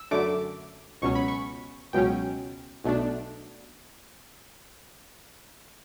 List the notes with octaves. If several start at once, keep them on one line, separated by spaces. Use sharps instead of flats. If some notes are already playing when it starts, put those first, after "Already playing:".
Already playing: E6
F#2 D3 A3 D6
C#2 B2 F#3 C#4 C#6
B5
C#6
C#2 B2 F#3 C#4 G5
B1 B2 A3 D4